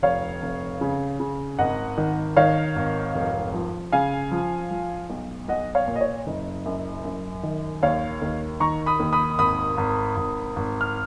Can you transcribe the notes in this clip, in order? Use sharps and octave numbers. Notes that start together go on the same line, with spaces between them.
F1 C#5 F5
F1
C#3
C#3
G#1 D#5 F#5
D#3
D#3 C#5 F5
G#1
F1
F3
C#3 F5 G#5
F3
F3
B1
B1 D#5 F#5
C#5 F5
A#2
D#5
C#5
F#1 D#5
F#2
F#2
D#3
D#2 C#5 F5
D#2
D#3 A#5 C#6
B5 D#6
D#2
B5 D#6
G#1 B5 D#6
G#1
G#1
G#1
F6